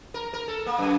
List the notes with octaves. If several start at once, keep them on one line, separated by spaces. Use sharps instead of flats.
A#4
A#4
A4
A#3
F#2